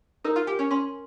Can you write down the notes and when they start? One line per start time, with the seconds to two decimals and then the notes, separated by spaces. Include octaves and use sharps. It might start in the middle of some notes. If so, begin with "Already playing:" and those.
0.24 D#4 A#4
0.36 F4
0.47 G4 G#5
0.59 C#4
0.71 C#4 C6